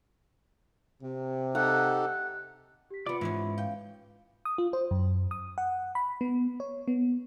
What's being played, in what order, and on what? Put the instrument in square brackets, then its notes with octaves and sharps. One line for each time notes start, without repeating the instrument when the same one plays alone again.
[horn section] C3
[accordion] D#4 G4 A4 [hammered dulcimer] F#5
[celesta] G4 B6
[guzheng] C3 B3 [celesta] F4 B5 C#7 [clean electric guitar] D5
[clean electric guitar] G#2 [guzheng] E3 B3 C#4
[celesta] F5 [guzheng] G5
[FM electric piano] D#6
F4
C5
F#2
D#6
F#5
B5
B3
C#5
B3